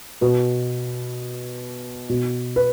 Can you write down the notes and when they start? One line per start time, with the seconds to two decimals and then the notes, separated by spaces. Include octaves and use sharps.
0.21 B2 B4
2.10 B2
2.56 B4